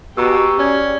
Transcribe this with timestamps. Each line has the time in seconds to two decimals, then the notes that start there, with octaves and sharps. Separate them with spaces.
0.17 B2 G4 G#4 A#5 C#6 E6
0.59 C#4 D5 G#6